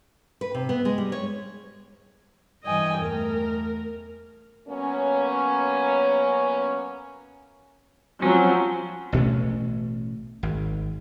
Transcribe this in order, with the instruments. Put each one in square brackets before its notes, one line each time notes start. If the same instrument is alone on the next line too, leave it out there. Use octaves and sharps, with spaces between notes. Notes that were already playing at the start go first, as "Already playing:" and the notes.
[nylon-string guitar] B4
C3
B3
G#3
G3
C#5
[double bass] G2 E3 [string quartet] D#5 G5 G#5
[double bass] E2 A3 [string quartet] A#4
[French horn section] F#3 A#3 B3 C#4
[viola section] F3 F#3 C4 [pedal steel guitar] C#4
[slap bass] A1 B2 A3 C#4
G#1